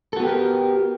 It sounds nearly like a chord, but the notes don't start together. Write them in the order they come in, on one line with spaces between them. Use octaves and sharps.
A4 F#4 B3 G4 A#4